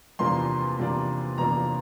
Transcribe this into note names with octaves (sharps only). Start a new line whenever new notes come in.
E2 C3 F3 A#3 D4 C6
E2 C3 F3 A#3 D4
E2 C3 F3 A#3 D4 A#5